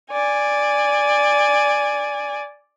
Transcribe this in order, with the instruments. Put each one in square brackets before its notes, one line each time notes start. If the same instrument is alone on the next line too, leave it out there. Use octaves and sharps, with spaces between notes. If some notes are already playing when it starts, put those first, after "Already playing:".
[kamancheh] D5 G#5